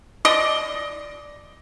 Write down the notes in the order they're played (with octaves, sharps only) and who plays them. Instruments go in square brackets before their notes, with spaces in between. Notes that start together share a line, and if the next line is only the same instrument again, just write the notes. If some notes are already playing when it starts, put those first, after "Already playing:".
[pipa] D5 D#5